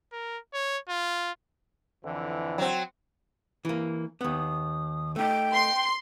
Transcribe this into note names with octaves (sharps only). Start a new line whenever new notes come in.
A#4
C#5
F4
F2 D3 E3
F#3 C4
E3 A#3
D#2 B3 D#6
A3 D#4 G5
C6